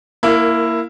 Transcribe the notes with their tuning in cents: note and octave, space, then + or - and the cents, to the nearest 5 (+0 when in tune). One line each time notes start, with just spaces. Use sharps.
A#3 +0 E4 +10 A#4 -25